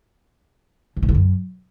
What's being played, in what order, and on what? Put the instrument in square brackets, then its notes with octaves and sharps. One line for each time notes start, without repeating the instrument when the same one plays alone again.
[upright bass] D3
B2
D3
F#2